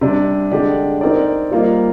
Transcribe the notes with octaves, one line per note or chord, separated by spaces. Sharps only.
C3 G3 D4
D3 G#3 D4 G4
C4 D#4 A#4 D5
G3 A#3 F4 C5 D#5